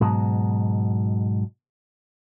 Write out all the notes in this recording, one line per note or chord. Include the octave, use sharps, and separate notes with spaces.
G#2 B2 F#3